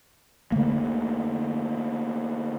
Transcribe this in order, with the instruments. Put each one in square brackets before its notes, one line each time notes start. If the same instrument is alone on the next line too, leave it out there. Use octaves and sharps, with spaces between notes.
[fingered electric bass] D3 A3 A#3